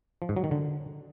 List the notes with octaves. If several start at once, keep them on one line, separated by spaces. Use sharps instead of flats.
F3
G#2
F#3
D#3
D3